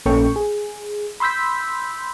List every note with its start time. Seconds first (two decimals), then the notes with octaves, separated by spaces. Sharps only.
0.06 A#1 A#3 C#4 A4 G5 C#6
0.36 G#4
1.20 B5 C6 E6 G6 B6